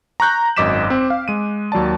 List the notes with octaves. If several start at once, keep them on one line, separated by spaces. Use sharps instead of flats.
A#5 C#6 F#6 G6
G#1 F#2 D#5 D6 B6 E7
C4
F5
G#3 D#7
D#2 F#3 D5 A5